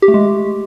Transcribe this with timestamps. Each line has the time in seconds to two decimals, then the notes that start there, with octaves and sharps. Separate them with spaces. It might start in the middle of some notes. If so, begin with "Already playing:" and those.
0.02 G4
0.08 A3
0.14 G#3